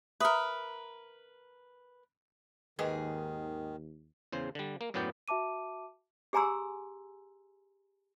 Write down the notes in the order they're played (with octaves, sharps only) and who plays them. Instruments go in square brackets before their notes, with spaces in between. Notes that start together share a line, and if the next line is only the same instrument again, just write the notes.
[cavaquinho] A#4 B4 [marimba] E5 D#6
[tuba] D#2 [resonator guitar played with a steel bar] G#2 G#4 [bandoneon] D#3 [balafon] B4 D#5 G5
[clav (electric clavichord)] E2 C#3 C5
D3 G3
A#3
F#2 A2 F#3 B3 D5 G5
[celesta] F#4 E5 A5 D6 D#7
[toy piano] G4 G#4 G#5 A#5 C6 E6